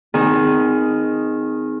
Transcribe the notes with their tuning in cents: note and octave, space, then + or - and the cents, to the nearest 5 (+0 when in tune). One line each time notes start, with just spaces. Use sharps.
D#3 +0 C4 -40 G#4 +0